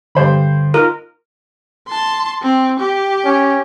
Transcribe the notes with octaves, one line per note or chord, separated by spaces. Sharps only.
G2 D3 C5 B5
D#4 F4 A#4
A5 C6
C4
G4
C#4